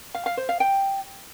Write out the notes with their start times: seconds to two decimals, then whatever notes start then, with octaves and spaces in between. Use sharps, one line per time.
0.15 F5
0.26 F5
0.37 C5
0.49 F5
0.60 G5